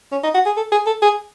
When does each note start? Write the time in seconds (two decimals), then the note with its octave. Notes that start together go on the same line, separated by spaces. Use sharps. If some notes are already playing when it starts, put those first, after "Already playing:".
0.12 C#4
0.23 D#4
0.34 F#4
0.46 G#4
0.57 A4
0.72 G#4
0.87 A4
1.02 G#4